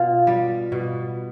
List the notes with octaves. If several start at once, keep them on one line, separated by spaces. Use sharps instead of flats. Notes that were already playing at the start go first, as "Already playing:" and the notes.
Already playing: B2 F4
G3
B2